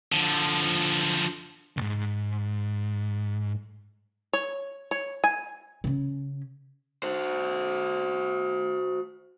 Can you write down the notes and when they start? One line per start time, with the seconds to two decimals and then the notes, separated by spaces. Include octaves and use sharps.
0.12 D3 F3
1.77 C2 G#2
4.33 C#5
4.91 C#5
5.24 G#5
5.84 C#3 C#4
7.03 F#4 C5